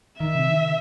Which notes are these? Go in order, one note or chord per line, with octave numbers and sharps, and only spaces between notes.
D#3 E5
C3
D#3